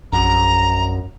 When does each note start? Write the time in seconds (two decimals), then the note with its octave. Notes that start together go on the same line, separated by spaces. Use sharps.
0.12 A#1 F#2 A#5